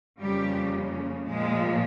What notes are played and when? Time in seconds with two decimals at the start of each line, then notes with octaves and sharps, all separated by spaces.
0.20 F2 C#3 F3 G3 A#3 G4
1.26 A#2 F3 G#3